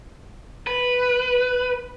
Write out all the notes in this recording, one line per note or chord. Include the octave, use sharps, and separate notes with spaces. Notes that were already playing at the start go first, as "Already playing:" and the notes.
B4